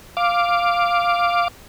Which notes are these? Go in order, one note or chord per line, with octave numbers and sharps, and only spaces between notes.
F5 D6